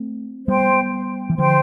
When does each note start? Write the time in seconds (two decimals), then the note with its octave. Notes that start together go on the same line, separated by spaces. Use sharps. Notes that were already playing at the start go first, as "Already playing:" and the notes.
Already playing: A3 C4
0.48 G3 B3 C5 G5 C6
1.30 E3
1.38 D3 F3 C5 G5 C6